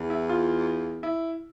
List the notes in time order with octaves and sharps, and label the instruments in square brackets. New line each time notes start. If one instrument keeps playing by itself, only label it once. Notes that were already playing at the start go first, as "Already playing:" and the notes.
Already playing: [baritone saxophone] E2
[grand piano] E4
F4
E4